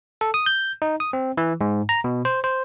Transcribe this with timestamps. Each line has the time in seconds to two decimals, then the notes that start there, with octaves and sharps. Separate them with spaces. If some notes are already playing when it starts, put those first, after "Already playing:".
0.21 A4
0.34 D#6
0.46 G6
0.82 D#4
1.00 D#6
1.13 C4
1.37 E3
1.61 G#2
1.89 A#5
2.04 B2
2.25 C5
2.44 C5